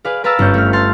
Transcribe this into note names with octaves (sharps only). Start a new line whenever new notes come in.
G#4 B4 D5 F5
A#4 B4 F5 A5 A#5 E6
G1 C#4 G6
A3 F6
A5 C6 F6